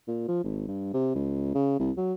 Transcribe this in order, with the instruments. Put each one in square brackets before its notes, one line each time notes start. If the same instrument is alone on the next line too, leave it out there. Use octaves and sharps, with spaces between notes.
[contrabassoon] A#2
F3
G#1
G2
C3
C#2
C#3
C2
F#3